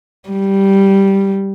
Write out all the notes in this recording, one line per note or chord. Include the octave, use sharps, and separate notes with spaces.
G3